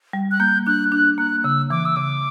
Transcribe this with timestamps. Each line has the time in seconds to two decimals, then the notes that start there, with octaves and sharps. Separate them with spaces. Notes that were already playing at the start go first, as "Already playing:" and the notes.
0.13 G3
0.31 F#6
0.40 A#3 G6
0.66 D4 F#6
0.92 D4 F#6
1.18 A#3 F#6
1.44 C#3 E6
1.70 E3 D6
1.86 E6
1.96 C#3 D6